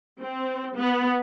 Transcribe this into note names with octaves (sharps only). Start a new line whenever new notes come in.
C4
B3